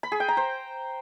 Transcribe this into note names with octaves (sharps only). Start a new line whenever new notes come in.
B5
G#4
G5
A#5
C5